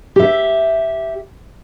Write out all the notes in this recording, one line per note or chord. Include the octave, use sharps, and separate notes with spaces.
G4 E5